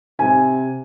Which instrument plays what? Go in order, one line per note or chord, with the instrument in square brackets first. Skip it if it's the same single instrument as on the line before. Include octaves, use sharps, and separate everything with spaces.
[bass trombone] C3 [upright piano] G#5